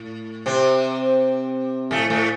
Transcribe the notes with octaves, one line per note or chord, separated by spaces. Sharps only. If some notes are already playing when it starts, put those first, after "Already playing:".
Already playing: A2
C3 C4
A2 A3
A2 A3